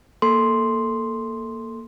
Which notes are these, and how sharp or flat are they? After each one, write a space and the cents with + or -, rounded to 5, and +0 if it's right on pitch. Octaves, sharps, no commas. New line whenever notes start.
A#3 +0 A4 +0 C6 +0